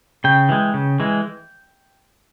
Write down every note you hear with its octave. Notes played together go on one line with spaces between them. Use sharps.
C#3 G5
E3 G#3
C#3
E3 G#3